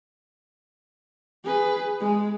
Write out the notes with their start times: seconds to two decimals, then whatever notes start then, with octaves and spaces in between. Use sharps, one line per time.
1.45 G#4 B4
2.00 G#3